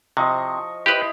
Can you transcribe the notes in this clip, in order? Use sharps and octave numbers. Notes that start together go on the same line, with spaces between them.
C3 F3 D#5 C#6
E4 G4 B4 C5 D#5